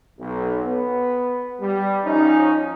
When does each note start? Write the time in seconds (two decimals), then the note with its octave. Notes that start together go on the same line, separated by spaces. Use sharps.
0.19 B1
0.64 B3
1.60 G3
2.04 F3 C#4 D#4